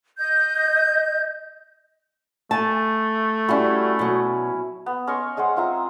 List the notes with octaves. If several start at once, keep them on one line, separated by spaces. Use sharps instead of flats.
D#5 G6
A3 G#5 A5
G3 C#4 E4 F#4
B2 F#3
B3
C#4 D#5 C6 C#6
G#3 G#4 C5 F#5
C4 F4 E5 A#5